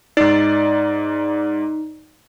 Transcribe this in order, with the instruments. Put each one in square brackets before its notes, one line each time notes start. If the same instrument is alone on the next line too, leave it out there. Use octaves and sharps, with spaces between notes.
[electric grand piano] G#2 D5 [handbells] D#4